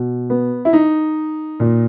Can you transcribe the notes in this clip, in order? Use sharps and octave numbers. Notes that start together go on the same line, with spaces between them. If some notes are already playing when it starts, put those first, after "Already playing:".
Already playing: B2
B3
E4
D#4
A#2